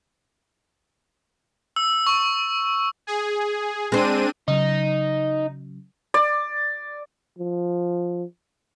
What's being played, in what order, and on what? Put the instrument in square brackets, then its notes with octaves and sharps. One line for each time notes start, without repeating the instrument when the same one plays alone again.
[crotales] E6
C#6
[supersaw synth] G#4
[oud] G#3 C5 [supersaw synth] C4 D4 D#7
[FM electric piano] C#3 F#3 [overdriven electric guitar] D#4
[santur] D5
[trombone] F3